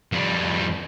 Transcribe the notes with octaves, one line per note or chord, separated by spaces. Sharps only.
F2 G3